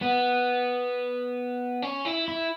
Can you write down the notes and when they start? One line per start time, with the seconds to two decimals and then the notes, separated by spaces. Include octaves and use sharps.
0.02 B3
1.82 C#4
2.05 E4
2.28 E4